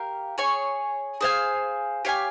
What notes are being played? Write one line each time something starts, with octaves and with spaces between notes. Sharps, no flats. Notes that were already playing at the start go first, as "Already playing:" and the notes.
Already playing: G4 A#4 F5
G#4 C#5 G#5
G#4 C5 F5 G#5
G4 C#5 F5 G#5